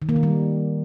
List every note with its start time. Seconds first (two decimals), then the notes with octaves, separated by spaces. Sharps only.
0.02 D#3
0.09 A#3
0.16 D#3
0.23 G3